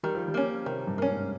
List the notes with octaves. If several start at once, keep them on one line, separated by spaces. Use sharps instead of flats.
D#3 G3
F3
G3
A#3 C#4
C3 D#3
G2
A#3 C#4
G#2